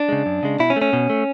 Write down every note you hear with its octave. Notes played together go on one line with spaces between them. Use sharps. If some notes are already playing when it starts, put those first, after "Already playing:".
Already playing: D4
C#3 G#3
F#2
C#3 G#3
B2 E4
C#4
A3
C#4
B2
A3